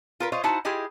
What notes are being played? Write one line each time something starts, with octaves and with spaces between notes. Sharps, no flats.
F4 A#4 B4
F4 C5 C#5 D#5 F5
D#4 E4 F#4 C5 F#5 A5
E4 F4 G4 G#4 D#5